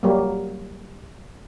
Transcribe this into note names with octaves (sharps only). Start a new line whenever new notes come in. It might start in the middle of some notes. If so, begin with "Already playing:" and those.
F#3 G3 A#3